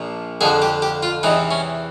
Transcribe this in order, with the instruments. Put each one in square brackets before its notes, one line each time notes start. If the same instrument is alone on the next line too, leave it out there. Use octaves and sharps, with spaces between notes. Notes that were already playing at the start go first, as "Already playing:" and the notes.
Already playing: [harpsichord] A#1 A#2 F3
F2 D3 F3 G#4
G4
G4
F4
E2 C3 E3 D#4
C#4